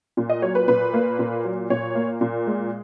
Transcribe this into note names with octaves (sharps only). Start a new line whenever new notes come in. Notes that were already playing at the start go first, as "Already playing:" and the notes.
A#2
D#5
F#3 C#5
B4
A#2 B4
A#3
A#2
F#3
A#2 C#5
A#3
A#2
G#3